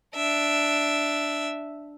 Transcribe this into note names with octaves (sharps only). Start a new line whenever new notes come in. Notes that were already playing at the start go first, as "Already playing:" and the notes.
D4 E5